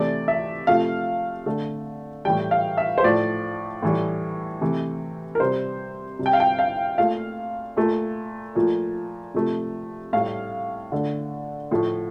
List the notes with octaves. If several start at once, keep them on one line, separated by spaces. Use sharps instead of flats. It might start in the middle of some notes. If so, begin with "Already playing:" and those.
Already playing: C3 E3 A3 D5
E5
C3 F3 A3 F5
D3 A3
A2 E3 G3 G5
F5
E5
C5
A2 F3 A3 D5
A2 E3 G3
C3 E3 A3
A#4
C3 G3 C5
C3 G3
G5
F5
G5
F5
A#2 A3 F5
A#2 A3
A#2 F3 A3
C3 F3 A3
A2 G3 F5
D3 A3
A2 F3 A3